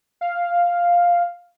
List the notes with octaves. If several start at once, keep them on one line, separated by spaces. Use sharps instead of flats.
F5